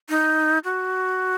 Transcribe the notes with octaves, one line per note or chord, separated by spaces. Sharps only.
D#4
F#4